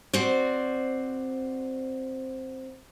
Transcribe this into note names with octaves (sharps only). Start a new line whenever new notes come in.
C4 F#4 C5 D5